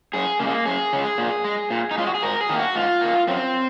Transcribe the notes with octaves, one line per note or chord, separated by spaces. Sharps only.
F#2 G#4
C#3 G#3 A#3
F#2 G#4
C#3 G#3
A#2
G#3
A#2
D#4
G#3 F4
F#4
G#4
G#2 A#4
G#4
D#3 A#3
F#4
G#2 F4
D#3 A#3
F#2 C4